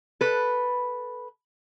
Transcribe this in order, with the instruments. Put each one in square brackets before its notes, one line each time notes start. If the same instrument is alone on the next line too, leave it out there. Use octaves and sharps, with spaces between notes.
[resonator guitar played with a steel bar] A4 B4